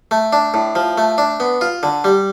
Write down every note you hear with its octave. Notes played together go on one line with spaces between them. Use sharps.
A3
D4
A2
F3
A3
D4
B3
F4
D3
G3